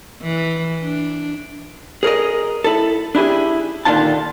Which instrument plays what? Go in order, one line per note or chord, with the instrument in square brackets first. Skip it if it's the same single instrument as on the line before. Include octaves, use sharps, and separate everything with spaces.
[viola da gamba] E3
D4
[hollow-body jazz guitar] G#4 A#4 C#5 D#5
E4 A4
D4 E4 G4 G#4
A#2 D3 D#3 D4 F4 A5